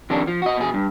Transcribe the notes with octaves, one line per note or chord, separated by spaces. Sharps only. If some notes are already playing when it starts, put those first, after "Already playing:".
F2 C3 D#3 C#4 D4
F3
F#4 D#5
B2 G#4
G2